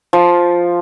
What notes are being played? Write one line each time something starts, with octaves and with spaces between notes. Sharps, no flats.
F3